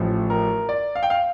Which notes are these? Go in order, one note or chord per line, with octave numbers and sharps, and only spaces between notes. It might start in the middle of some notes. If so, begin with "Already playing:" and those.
Already playing: A1 A2 F3
A#4
D5
F5
G5
F5